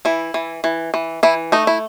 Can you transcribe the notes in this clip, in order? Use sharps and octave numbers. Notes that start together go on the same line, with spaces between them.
E3 E4
E3
E3
E3
E3 E4
A3 D#4
E4